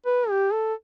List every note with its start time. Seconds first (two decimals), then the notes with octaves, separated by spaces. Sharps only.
0.06 B4
0.30 G4
0.53 A4